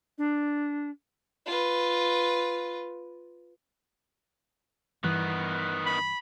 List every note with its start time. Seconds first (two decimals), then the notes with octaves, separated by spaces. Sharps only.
0.18 D4
1.46 F4 B4
5.04 G2 D#3 E3 B3
5.86 B5